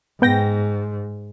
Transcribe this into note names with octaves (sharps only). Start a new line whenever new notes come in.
G#2 B3 G5 A#6